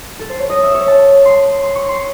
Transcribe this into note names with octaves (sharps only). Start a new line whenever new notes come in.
A4
C5
C#5
D#5
E5
C#5
A5
C6
C6
C#6
C6